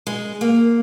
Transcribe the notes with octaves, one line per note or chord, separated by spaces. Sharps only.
G#3
A#3